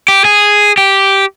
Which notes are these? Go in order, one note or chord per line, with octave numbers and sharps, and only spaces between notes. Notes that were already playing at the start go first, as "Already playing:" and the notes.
G4
G#4
G4